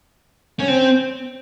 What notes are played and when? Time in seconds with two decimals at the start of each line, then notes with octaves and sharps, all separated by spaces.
0.59 C#4
0.68 C4